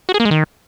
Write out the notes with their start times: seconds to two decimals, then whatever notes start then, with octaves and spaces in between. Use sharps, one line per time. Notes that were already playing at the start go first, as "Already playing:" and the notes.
0.09 F#4
0.14 G#4
0.20 A#3
0.25 G#3
0.31 D#3